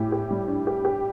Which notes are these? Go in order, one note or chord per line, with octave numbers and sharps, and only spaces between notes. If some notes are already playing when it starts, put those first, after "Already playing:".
Already playing: A2 G4
G4
G3
D4
G4
G4